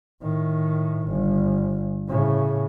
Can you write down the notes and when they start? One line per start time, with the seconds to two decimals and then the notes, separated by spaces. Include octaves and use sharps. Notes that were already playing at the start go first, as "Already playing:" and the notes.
0.22 A2 D#3
1.08 G1
2.08 A2 C#3